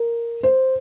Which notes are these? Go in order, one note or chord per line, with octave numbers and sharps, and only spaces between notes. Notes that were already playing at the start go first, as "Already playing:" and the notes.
Already playing: A#4
C5